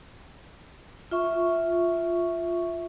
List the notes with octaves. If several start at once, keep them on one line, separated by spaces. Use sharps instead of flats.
F4 E5 C#6